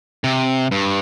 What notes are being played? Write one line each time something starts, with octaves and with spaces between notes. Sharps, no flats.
C3
G2